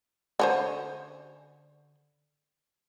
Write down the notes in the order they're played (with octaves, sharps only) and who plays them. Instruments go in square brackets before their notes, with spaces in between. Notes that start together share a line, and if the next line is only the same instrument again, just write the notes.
[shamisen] D3 C#4 C5